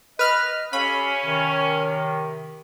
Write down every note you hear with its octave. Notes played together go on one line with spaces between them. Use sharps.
B4 D#5 F6
C#4 G4 A4 F5 B5
C3 D#3